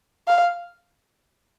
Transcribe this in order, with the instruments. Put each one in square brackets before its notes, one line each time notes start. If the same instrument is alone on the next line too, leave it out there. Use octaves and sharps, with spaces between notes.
[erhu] F5